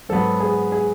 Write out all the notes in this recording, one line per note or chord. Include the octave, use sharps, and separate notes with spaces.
G#2 F#3 B3 A4
G#4
G#4